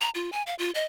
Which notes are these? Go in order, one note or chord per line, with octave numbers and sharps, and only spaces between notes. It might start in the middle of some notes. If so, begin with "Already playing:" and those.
A#5
F4
G#5
F5
F4
D#5